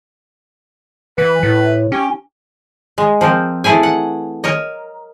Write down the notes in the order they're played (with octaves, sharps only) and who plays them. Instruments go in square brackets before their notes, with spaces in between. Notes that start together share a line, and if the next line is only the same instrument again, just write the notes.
[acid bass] E3 [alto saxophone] B4
[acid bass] A2
[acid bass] C#4 [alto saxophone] G4
[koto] G#3
F3 C4 A#4
E3 A3 E4 G#4 G#5
F#5
A#4 C#5 D#5